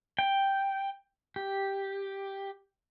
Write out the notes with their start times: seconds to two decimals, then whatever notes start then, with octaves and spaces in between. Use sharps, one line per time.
0.19 G5
1.36 G4